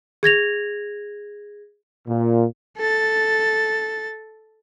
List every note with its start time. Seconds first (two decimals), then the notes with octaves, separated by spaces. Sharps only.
0.23 G#4 G#6 A#6 F7
2.07 A#2
2.78 A4 A6